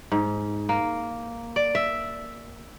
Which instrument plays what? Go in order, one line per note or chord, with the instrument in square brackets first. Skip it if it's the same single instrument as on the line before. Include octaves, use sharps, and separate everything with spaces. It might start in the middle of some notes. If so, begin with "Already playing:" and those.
[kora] G#2
A#3
D5
E5